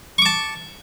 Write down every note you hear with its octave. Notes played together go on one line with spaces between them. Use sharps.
A5 C#6 D6